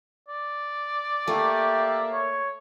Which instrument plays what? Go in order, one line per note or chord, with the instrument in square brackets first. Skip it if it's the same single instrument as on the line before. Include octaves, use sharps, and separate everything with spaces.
[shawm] D5
[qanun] A3 [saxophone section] A#3 E5 [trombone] G4
[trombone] C#5